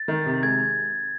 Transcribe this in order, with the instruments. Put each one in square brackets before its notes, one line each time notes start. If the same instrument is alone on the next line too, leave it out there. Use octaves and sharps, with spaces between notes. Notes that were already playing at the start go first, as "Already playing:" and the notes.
Already playing: [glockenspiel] A6
[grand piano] D#3
C3
[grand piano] G#3 [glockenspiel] G#6